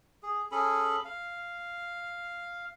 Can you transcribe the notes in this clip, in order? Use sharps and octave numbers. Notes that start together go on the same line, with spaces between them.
G#4
C#4 G#4 A4 B5
F5